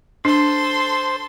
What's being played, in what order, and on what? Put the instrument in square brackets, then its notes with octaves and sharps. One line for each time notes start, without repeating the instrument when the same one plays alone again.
[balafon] D4 [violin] A4 C6 [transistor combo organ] C5